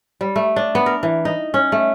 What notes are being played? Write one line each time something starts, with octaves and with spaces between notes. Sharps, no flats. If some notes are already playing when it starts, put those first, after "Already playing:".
G3
A3
D4
B3
A#4
E3
D#4
C#4
A3